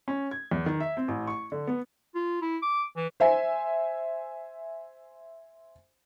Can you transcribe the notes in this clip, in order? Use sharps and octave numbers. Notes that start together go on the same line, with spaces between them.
C#4
G#6
E2
D#3
E5
C4
A1
C#6
D3
B3
F4
E4
D6
E3
C5 E5 G#5